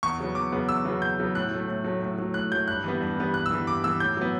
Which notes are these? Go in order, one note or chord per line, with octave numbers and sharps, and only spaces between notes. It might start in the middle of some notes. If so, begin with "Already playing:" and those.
E2 C#6
C#3 F#3 B3
E2 D6
C#3 F#3 B3
E2 E6
C#3 F#3 B3
E2 G6
C#3 F#3 B3
A2 F#6
F#3 A3
A2
F#3 A3
A2
F#3 A3
A2 F#6
F#3 A3 G6
G2 F#6
E3 G3 B3
G2
E3 G3 B3
G2 F#6
E6
E3 G3 B3
G2 D6
E3 G3 B3 E6
A2 G6
F#3 B3